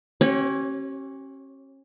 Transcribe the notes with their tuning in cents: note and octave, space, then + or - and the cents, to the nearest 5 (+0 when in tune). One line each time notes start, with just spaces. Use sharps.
C#4 -35 G4 -40 C#5 +0